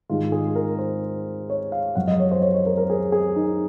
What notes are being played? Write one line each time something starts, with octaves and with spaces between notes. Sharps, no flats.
G#2 D#3 G#3 F4
G#4
A#4
C5
C#5
F5
F#2 F3 G#3 F#5
D#5
C#5
C5
C#5
C#5
A#4
A#4
G#4
G#4
D#4